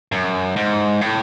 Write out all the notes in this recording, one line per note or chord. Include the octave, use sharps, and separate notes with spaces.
F#2
G#2
A2